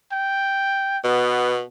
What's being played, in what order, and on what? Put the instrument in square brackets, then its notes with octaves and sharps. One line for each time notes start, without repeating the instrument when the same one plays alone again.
[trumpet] G5
[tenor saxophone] B2 [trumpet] B3